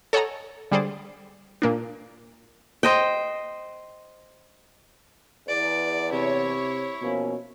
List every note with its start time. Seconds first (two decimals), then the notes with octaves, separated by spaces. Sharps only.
0.13 A4 C#5 D#5 F#5 G#5 A#5
0.71 D3 G3 G#4 C5 D5
1.62 A#2 A#3 D4
2.83 C5 D#5 G5
5.48 E2 D5
6.12 C3 E4 C#5
7.01 B2 F3 A#3 C#4